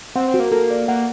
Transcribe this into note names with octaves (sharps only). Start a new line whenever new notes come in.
C4 F#5
C4
F#4
A#3
A#3 A4
D5
A#3 F#5